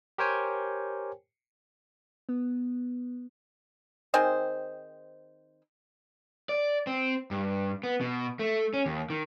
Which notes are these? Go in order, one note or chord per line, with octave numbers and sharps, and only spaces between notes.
G4 A#4 C5 C#5 G5 G#5
B3
D#3 C4 G#4 C5
D5
C4
G2
B3
B2
A3
C#4
D#2
D#3